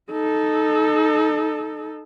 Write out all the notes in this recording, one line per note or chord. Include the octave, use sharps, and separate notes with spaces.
D#4 A4